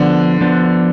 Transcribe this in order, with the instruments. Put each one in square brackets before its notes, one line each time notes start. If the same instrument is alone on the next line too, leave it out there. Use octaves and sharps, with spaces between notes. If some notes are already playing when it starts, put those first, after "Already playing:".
Already playing: [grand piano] D3 [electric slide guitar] F3 B3 D4
[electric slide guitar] F3 B3 D4